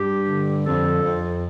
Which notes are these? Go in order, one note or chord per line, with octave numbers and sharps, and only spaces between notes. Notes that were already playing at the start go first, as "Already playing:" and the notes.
Already playing: G2 G4
D3
F2 A4
F2